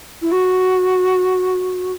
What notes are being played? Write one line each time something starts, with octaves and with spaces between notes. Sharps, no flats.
E4
F#4